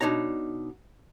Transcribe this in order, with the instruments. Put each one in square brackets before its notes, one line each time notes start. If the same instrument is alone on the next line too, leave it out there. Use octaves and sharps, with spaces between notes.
[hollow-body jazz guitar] B2 D4 D#4 C#5 A#5